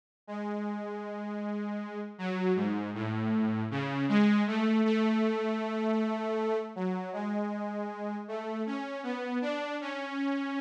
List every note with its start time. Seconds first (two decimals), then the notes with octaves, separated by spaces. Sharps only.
0.27 G#3
2.18 F#3
2.56 G#2
2.94 A2
3.71 C#3
4.09 G#3
4.47 A3
4.85 A3
6.76 F#3
7.13 G#3
8.28 A3
8.66 C#4
9.03 B3
9.41 D4
9.81 C#4